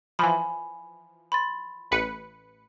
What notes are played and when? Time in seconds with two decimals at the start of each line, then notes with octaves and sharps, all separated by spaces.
0.19 E3 F3 G#5 B5
1.32 B5 C6 A6
1.91 A1 B4 C#7